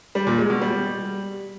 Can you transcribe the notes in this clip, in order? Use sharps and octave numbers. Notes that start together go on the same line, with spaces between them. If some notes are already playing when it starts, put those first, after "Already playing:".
G3
A#2
G#3
B2
G3